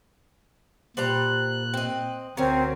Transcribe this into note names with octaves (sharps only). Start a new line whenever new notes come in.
A#2 G3 C5 A#5 F#6
C4 D#5
D2 F#3 C4 C#4 A#4